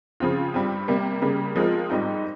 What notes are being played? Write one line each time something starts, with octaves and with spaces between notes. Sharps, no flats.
C#3 F3 C4 F4
G2 G3 C4
C3 G3 A#3
C#3 G3 A#3
F3 G#3 C4 F4 A#4
G#2 G3 C4 D#4